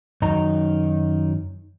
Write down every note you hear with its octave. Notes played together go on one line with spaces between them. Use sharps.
F#2 D#3 D#4 A#5